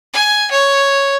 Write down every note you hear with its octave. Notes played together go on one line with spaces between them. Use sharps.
G#5
C#5